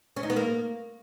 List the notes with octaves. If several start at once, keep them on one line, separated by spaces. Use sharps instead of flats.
C#4
D#4
B3
A#3